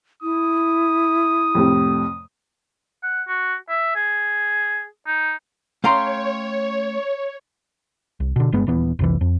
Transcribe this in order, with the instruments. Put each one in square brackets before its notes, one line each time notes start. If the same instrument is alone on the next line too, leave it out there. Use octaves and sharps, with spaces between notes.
[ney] E4 [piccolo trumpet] D#6
[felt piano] F2 A2 C3
[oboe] F#5
F#4
E5
G#4
D#4
[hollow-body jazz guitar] A3 F5 A#5 [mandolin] C#4 G5 C6 [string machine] C#5
[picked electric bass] C2
B2 D3
G1 G2 G#3 B3
D#1 E3 B3
F1 C2 E3
F2